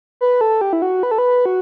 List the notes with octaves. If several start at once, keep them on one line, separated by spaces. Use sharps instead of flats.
B4
A4
G4
E4
F#4
B4
A4
B4
F#4